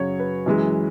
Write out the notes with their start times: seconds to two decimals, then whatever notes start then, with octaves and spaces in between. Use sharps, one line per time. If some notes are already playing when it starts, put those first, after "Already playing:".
Already playing: F#2 C#3 F#3 C#5
0.20 B4
0.46 F#2 E3 G#3